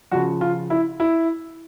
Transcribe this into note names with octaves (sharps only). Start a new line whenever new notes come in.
C#3 F3 F#4
F4
E4
E4